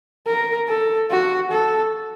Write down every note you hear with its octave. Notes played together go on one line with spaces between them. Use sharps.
A#4
A4
F#4
A4